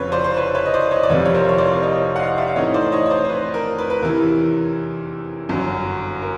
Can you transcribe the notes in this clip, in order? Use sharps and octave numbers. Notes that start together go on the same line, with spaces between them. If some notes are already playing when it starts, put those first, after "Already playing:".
Already playing: F1 F2 C#3 B4 C#5
C5 D5
C5
B4 C#5
B4 C#5
D#5
C5 D5
C#5 D#5
D5
F1 F2 C3 B4 C#5
C#5
A#4 C5
C#5
C5 D5
D5
C#5 D#5
F#5
D#5 F5
D5 E5
A2 E3 A3 C4 D#4 C#5 D#5
C5 D5
C#5 D#5
C#5
C5 D5
C5
B4
A#4
B4
B4
E2 C3 E3 A#4
G1 F#2 D3 F#3
A#4